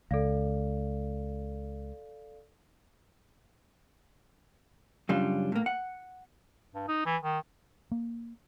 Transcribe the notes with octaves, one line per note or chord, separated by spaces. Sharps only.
C#2 A4 D5 F5
F#2 C#3 G3 D4 F4
A2 A#3
F#5
G2
D#4
E3
D#3
A#3